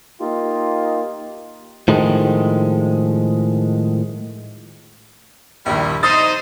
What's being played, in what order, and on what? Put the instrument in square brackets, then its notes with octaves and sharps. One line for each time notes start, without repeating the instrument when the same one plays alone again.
[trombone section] A#3 D#4 F4 G4
[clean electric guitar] A2 D#3 F3 G#3
[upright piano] A#1 D#2 [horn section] G3 E4
[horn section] D#4 C5 [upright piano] D#6 A6